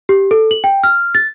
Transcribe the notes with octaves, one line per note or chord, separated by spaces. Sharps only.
G4
A4
F#7
G5
F6
A6